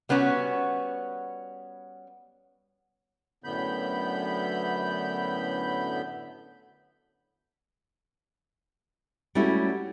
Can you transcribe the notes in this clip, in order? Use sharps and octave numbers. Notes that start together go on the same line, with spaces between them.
G3 B3 C#4 D4 F#4
F#2 A2 D3 B3 B5 G6
G3 A3 C#4 E4 F#4